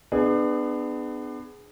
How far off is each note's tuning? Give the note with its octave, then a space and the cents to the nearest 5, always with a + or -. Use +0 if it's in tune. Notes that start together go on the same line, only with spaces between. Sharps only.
B3 +25 D4 +35 G#4 +0